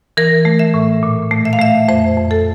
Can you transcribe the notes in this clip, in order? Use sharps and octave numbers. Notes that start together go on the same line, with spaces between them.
E3 A#4
A3
E5
A2
A#2
A3
E5
F5
A3 E5
F2 C5
F2
A4